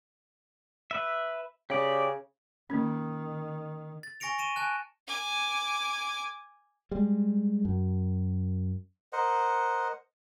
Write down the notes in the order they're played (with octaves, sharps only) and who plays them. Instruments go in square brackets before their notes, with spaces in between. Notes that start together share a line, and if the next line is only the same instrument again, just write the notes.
[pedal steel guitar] B4 E5
[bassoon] C#3 [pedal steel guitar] G4 D5
[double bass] D#3 [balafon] A#3 C#4
[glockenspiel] A6
G#5 C#6 A#6 C#7 D7 F7
C#6 D#7 E7
G#5 A5 F#6
[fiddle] G#5 D6
[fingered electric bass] G3 G#3
F#2
[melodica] A#4 C5 D#5 F#5